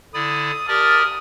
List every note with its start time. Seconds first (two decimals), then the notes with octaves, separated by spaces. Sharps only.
0.14 D3 E4 D5 D#6
0.68 G4 A#4 D5 A5 D#6 F6